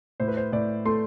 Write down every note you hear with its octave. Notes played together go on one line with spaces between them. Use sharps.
A2 C5
B4
C5
A2 D5
A3 C6